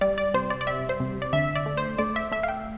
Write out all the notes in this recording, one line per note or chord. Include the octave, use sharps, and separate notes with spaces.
G3 D5
D5
C3 C5
D5
D5
G3 E5
C5
C3
D5
D3 E5
D5
A3
C5
A3 D5
E5
A3 E5
F5
G5